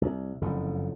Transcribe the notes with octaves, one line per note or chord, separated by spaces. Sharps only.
C2
F#1 F2 A2 D3